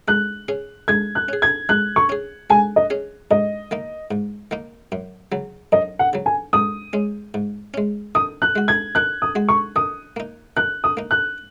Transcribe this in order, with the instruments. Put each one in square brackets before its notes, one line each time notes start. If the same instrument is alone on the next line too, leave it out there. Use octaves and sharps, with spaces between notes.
[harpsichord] G#3 [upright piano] F#6
[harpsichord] C#4 G#4
[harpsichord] G#3 [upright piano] G#6
[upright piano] F#6
[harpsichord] C#4 G#4
[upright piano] G#6
[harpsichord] G#3 [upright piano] F#6
[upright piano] C#6
[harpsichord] C#4 G#4
[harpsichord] G#3 [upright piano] G#5
[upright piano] D#5
[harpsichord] C#4 G#4
[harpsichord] G#2 [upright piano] D#5
[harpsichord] D#3 A#3 D#4
G#2
D#3 A#3 D#4
F#2
C#3 F#3
[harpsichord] F#2 [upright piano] D#5
[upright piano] F#5
[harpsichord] C#3 F#3
[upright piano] G#5
[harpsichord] G#2 [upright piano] D#6
[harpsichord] G#3 C#4
G#2
G#3 C#4
[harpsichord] D#3 [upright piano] D#6
[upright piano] F#6
[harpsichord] G#3 F#4
[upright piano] G#6
[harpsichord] D#3 [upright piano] F#6
[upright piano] D#6
[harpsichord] G#3 F#4
[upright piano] C#6
[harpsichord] D#3 [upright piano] D#6
[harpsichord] A#3 D#4
[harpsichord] D#3 [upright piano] F#6
[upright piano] D#6
[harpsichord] A#3 D#4
[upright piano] F#6